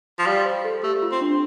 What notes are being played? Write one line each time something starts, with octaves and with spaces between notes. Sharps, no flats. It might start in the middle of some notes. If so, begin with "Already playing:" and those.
F3
G3 F5
C5
A4
A3 G4
F4
C4
D4